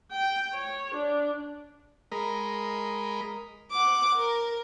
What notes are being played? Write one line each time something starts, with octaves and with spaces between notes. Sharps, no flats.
G5
C#5
D4
G#3 A#4 D#5 B5
F#5 D6
A#4